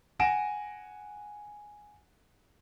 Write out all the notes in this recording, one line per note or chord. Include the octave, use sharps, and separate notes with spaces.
F#5 G#5 A#6 D7 E7